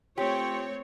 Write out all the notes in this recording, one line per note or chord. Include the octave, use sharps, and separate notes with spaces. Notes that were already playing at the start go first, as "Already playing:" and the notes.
A3 C4 F4 G4 C#5